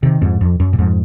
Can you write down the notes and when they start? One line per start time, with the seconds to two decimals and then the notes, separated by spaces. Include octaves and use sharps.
0.03 C3 D#3
0.22 F2 G#2
0.41 F2
0.60 F#2
0.73 A#2
0.79 F2 G#2